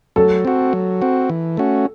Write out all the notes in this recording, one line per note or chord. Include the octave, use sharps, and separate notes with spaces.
F#3 A4
C4 F#4
F#3
C4 F#4
E3
A3 C#4 F#4